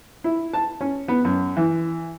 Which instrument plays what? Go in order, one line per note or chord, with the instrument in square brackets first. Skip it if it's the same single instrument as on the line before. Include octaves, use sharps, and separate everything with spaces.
[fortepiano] E4
A5
C#4
B3
F#2
E3